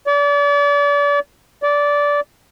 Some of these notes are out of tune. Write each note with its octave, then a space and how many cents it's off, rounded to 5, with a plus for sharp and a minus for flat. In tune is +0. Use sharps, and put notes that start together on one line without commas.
D5 -35
D5 -15